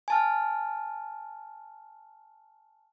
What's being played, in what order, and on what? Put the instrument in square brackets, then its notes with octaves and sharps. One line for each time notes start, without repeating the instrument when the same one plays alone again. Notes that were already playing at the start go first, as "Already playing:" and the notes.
[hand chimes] G#5 A5 F6